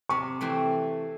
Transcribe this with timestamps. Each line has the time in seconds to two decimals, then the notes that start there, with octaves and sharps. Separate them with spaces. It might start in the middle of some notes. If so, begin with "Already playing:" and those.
0.09 C3 C#6
0.41 E3 A3 C4